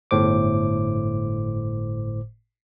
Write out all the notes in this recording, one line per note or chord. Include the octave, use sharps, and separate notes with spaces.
G1 A2 C5 D6